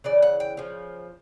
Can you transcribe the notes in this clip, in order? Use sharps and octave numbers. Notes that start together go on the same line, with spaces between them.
C#3 E3 D5
F#5
G5
C#3 F3